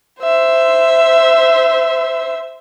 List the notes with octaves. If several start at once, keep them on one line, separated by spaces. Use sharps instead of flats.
C5 E5